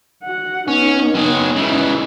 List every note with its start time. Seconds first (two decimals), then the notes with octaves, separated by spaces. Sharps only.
0.23 F#4 F#5
0.68 B3 C#4 D#4
1.15 F#3 G#4
1.55 C#3 E3 G#3